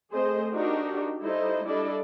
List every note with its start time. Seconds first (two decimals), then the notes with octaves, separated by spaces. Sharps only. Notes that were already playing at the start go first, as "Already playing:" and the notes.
0.12 A3 C4 G#4 C5 D#5
0.54 D4 D#4 F#4 G4 A#4
1.22 G3 D#4 E4 A4 C5 D#5
1.65 G3 D4 E4 A4 D5 D#5